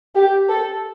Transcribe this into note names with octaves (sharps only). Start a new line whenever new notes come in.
G4
A4